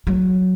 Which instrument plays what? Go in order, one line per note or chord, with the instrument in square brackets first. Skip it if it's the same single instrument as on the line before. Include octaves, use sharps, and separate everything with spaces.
[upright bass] F#3